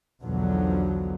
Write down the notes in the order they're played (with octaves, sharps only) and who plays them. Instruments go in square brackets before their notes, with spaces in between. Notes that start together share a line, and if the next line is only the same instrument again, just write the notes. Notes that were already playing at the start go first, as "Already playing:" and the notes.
[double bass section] B1 E2 B2 D3 F3 F#3